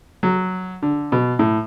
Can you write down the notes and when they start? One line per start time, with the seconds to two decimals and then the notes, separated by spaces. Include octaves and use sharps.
0.23 F#3
0.82 D3
1.12 B2
1.39 A2